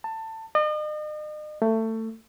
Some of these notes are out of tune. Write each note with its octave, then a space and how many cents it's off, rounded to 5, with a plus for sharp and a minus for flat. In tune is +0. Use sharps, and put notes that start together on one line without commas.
A5 +20
D#5 -40
A3 +20